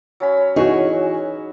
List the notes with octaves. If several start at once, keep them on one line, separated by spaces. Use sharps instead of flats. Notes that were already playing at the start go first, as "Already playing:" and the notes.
F#3 C#4 B5
E3 D#4 F#4 G#4 C#5